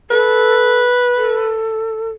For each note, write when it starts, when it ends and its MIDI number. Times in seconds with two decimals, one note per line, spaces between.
0.11 0.80 69
0.11 1.65 71
1.17 2.09 69